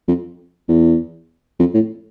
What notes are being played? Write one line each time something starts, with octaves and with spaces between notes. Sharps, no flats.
F2
E2
F2
A2